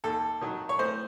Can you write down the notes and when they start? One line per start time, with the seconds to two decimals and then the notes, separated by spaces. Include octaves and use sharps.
0.04 D#2 A4
0.41 D#3 F#3
0.69 C#5
0.79 A2 C5